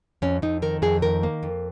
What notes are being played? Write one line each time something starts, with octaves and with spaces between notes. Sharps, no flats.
F2 C#4
F2 D#4
D#3 A#4
F2 G#4
D#3 A#4
A#3
F2